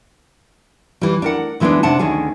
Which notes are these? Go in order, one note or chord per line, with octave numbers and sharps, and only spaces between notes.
E3 G3
D4 A#4 F#5
D2 E3 G#3 A#3 B3 D4
C3 D4 F#5 A5
D2 D#3 C#4 D4 G#4